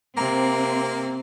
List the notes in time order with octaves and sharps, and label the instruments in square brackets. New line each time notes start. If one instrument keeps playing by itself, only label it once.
[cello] C3 [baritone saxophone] A#3 [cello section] C4 [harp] A#5